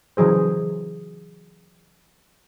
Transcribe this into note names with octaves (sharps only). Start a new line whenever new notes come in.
C#3 E3 F#3 G#4 C5